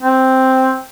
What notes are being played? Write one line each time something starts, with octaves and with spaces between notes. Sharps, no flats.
C4